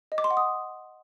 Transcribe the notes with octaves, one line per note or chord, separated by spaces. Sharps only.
D#5
D6
C6
F#5
D#6